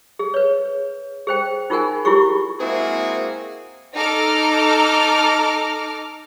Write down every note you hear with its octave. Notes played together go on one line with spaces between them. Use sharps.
G#4
B4 C#5
G#4 C5 G5
D#4 F4 G#4 A#4 F#5 G#5
E4 F4 G4 G#4 C#6
G#3 A#3 C4 E4 F#4 G#4
D#4 A4 A#5 D6 F6